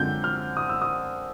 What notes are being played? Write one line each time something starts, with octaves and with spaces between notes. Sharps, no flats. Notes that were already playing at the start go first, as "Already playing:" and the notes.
Already playing: F#2 D3 F3 G#3 C4 G6
F6
D#6
E6
D#6